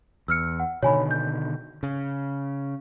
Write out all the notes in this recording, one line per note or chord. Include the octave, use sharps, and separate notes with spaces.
E2 E6 F6 C#7
F#5
B2 D3 D#3 C#5 G#5 B5
G6
C#3